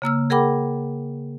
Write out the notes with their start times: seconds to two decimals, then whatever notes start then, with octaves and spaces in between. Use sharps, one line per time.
0.02 C#3 A#3 E6 F6
0.30 G#4 A#4 F#5 G5 B5 D6